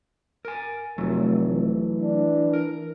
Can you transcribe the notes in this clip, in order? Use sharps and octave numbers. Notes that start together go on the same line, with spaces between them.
A#4 G#5
F1 F#3 A3
E3
D4
A#4